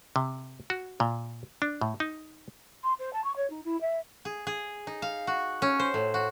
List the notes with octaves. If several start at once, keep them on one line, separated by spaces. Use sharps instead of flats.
C3
F#4
A#2
D4
A2
D#4
C6
C5
A5
C#6
C#5
D#4
E4
E5
G#4
G#4
D#4
F5
F#4
C#4
C5
A2
F#4